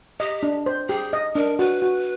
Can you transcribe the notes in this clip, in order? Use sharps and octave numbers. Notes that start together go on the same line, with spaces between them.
G4 D#5
D4
C5
G4 G#4
D#5
D4 A#4
F#4 B4
F#4